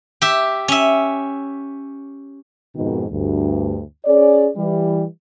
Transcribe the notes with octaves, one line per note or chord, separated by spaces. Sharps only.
G4 E5
C#4 E5
F2 G#2 B2 D#3
D2 G2
C#4 G#4 C#5 D5
E3 G3